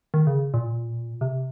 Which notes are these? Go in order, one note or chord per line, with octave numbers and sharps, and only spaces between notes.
D#3
C#3
A#2
C3